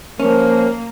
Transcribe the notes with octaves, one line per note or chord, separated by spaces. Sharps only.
F3 A#3 C#4 A#4